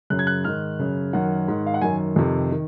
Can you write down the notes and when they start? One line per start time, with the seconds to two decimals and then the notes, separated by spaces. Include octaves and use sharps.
0.10 F#2 C#3 F#6
0.19 G#6
0.27 F#6
0.44 G#2 D#3 F6
0.79 F#2 C#3
1.13 F#2 D#3 F#5
1.48 G#2 D#3
1.66 F5
1.74 F#5
1.81 F#2 D#3 G#5
2.16 F2 C3 D#3
2.52 D#3